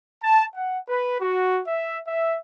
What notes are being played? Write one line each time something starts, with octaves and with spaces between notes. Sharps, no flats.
A5
F#5
B4
F#4
E5
E5